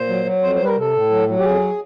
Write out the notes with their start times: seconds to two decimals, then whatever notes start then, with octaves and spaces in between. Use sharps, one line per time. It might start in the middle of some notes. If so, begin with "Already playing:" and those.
Already playing: A#2 C5
0.08 F#3
0.25 F#3
0.42 F2 C5
0.55 C5
0.59 G3 B4
0.67 A#4
0.76 C3 A4
0.93 A2
1.10 F#3
1.28 F#3
1.39 G4
1.44 F2 G#4